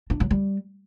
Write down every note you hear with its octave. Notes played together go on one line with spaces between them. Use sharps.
D4
F#3
G3